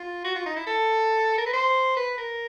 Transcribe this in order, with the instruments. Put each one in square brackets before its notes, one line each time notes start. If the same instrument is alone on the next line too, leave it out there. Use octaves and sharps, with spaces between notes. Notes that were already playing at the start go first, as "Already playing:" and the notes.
Already playing: [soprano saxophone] F4
F#4
F4
D#4
E4
A4
A#4
B4
C5
B4
A#4